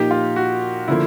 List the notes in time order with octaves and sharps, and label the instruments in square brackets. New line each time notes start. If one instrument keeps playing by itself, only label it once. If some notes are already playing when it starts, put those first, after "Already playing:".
Already playing: [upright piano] A#2 F3 A#3 D#4 [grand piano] G4
[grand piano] F4
F#4
[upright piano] D3 F3 A#3 [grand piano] E4